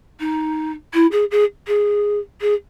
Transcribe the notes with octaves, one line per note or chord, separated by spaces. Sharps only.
D#4
E4
G#4
G#4
G#4
G#4